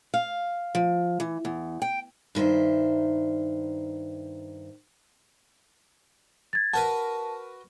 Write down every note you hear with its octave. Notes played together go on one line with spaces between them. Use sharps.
F5
F3
E3
E2
G5
G2 D#3 C5 E5
G#6 A6
F#4 A#4 B4 A5